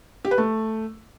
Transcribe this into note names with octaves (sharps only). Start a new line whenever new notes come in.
G4
B4
A3